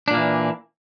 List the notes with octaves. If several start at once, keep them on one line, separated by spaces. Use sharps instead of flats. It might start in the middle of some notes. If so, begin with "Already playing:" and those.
A#2 E3 A#3 D4